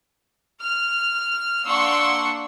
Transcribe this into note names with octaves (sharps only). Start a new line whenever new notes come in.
F6
A#3 D4 F#5 C6 C#6 E6